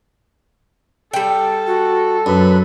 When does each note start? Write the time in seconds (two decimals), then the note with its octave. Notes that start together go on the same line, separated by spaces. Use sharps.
1.13 G3 A4 G5
1.67 F#4
2.26 F#2 B4